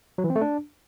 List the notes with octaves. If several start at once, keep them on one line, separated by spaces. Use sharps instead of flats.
F#3
E3
C4
A3
D4